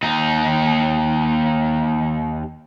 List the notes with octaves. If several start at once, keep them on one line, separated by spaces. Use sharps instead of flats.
D#2 D#4